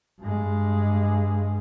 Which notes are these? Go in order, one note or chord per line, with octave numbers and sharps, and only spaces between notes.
G2 G#3